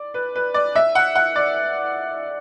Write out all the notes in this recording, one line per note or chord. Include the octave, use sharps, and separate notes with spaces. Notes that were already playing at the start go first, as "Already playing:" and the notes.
Already playing: D5
B4
B4
D5
E5
F#5
F#5
D5